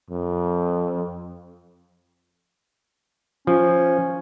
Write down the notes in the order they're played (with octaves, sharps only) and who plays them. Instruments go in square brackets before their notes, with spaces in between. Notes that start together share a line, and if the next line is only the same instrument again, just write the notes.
[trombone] F2
[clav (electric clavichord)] F3 [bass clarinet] C#4